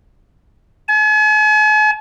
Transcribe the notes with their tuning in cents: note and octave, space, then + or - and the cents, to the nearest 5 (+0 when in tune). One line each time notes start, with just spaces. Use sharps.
G#5 +45